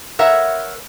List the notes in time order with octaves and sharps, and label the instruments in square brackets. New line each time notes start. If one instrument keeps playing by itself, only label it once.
[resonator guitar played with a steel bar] A#4 B4 C#5 E5 F#5